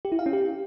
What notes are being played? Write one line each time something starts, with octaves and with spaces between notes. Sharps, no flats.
G4
E4
F5
C#4
G4